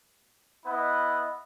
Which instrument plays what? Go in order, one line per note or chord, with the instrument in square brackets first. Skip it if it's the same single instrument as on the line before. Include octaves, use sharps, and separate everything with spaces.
[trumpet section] B3 E4 B4 D#5 F#5